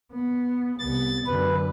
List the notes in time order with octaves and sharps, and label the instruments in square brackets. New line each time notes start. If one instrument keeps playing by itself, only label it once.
[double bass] B3
[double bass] C2 B3 [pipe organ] A6
[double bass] F#2 D3 [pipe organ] B4